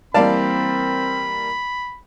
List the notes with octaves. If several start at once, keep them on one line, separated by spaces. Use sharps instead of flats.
E3 G3 A#3 C4 D5 F5 A5 B5